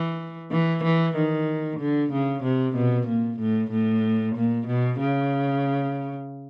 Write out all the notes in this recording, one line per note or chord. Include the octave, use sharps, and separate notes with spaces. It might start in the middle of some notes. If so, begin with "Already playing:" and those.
Already playing: E3
E3
E3
D#3
D3
C#3
C3
B2
A#2
A2
A2
A#2
B2
C#3